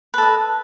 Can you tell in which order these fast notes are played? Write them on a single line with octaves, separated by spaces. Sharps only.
B4 A4 D#5